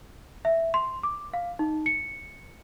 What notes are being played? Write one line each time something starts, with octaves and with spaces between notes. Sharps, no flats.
E5
C6
D6
F5
D#4
C#7